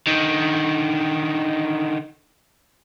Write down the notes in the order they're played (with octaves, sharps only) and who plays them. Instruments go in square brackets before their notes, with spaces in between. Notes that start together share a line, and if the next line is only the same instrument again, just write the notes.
[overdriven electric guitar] D3 D#3